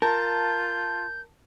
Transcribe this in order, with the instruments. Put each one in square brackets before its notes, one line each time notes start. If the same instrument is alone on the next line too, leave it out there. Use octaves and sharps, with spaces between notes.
[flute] F4 [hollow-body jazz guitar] A#4 [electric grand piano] A5 [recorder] G6